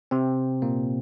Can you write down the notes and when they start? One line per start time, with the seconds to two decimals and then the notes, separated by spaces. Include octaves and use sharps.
0.11 C3 C4
0.62 A#2 A#3